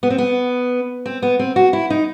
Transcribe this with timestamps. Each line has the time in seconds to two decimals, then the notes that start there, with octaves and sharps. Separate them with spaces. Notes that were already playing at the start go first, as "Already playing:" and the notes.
0.03 B3
0.10 C4
0.18 B3
1.06 C4
1.22 B3
1.39 C4
1.56 F#4
1.73 E4
1.90 D#4